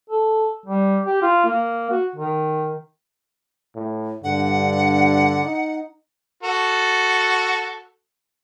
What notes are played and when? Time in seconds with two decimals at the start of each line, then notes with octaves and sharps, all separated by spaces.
0.10 A4
0.66 G3
1.05 G4
1.22 F4
1.45 A#3
1.91 F#4
2.16 D#3
3.75 A2
4.24 G2 D3 F#5
5.44 D#4
6.43 F#4 A4